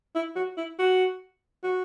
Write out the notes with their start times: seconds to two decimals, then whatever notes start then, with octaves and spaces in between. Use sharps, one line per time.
0.15 E4
0.36 F#4
0.57 E4
0.79 F#4
1.64 F#4